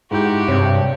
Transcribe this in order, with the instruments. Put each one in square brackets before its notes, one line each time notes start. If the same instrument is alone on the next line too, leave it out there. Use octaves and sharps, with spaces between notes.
[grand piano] G#2 E4 G6 [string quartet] F#4 G4
[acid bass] G2 [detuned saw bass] C3 [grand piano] C#5 G6